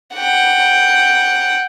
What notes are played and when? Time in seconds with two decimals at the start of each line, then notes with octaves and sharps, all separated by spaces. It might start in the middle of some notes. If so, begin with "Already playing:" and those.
0.14 F#5 G5